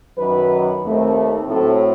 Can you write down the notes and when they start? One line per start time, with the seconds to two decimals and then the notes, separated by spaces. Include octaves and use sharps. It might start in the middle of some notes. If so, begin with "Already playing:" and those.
0.17 F#2 D#3 F#3 B4
0.83 D#2 D#3 A3 C4
1.48 A2 F#3 C4 A4